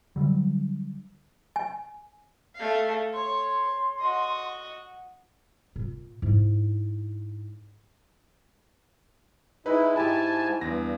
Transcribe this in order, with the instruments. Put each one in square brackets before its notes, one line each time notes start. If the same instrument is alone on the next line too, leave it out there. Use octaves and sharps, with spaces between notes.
[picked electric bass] D3 F#3 G3
[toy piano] G#5
[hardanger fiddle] A3 F5
[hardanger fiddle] C#5 [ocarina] C6
[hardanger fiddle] F#4 D#5
[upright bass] A#2
G#2 E4
[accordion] G#3 E4 [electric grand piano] D#4 B4
[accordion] G#2 G#5 A5 [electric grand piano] E4 G4
[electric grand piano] E2 A#6 [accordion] G2